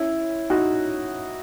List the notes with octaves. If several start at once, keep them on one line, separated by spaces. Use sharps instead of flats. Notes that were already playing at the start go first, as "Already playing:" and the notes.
Already playing: C#4 E4
D#4 F#4